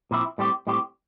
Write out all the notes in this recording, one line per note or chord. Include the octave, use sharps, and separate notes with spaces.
A#2 F3 C4 E4
A2 G3 C4 G4
A2 G3 C4 G4